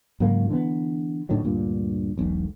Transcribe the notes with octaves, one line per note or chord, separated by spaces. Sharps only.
G#2 C#3 F#3 A#3
D3 E3 G#3 B3
A2 D3 D#3 F#3
D2 G2 A#2
E1 B1